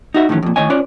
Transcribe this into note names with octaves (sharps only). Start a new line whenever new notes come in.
D#4 F#4 E5
A2 D#3 E3 F#3 C#4
F2 A#2
A2 D#3 B3 C#5 D#5 G#5
C#4 F4 B4 C#5 D5